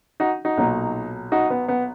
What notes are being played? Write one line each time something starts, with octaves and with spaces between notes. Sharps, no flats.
D#4 F#4
D#4 F#4
B1 A#2 F#3 A#3
D#4 F#4
B3
B3